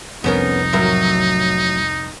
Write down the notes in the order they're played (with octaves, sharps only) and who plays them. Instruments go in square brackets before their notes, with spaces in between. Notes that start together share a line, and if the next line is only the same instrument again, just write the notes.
[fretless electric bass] F1 C2 F2 [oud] B3 C#4 A#4 [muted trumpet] D#4
[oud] A2 F#3 A#4